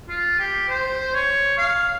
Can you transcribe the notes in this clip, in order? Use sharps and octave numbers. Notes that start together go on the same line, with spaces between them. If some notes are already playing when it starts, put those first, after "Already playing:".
F4
G4
C5
C#5
F5